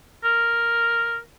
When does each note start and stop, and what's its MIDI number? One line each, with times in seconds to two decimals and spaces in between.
0.24 1.18 70